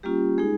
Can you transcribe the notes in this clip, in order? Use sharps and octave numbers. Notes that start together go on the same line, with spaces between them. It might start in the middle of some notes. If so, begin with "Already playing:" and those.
G3 A#3 C#4 F4 G4
G#3 D#4 G#4